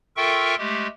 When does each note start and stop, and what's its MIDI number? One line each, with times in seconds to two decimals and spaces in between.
0.17 0.55 65
0.17 0.55 69
0.17 0.55 70
0.17 0.55 76
0.17 0.55 79
0.17 0.55 85
0.59 0.87 56
0.59 0.87 57
0.59 0.87 67